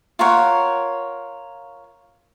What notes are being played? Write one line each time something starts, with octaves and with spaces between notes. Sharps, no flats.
F4 A#4 C#5 F#5